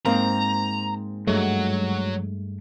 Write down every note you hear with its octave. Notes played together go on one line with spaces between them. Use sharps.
G#2 A#3 C4 A#5
G2 F#3 G#3 A3